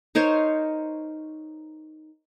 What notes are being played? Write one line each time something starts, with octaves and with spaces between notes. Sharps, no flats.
D#4 A#4 C5 C#5